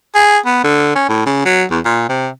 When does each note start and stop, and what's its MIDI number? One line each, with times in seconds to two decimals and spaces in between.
0.15 0.38 68
0.46 0.60 59
0.64 0.92 50
0.95 1.08 61
1.09 1.24 45
1.26 1.42 49
1.45 1.63 54
1.70 1.79 40
1.85 2.05 46
2.09 2.29 48